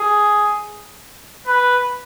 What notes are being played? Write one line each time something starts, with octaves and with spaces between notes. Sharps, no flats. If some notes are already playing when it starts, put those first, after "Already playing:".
Already playing: G#4
B4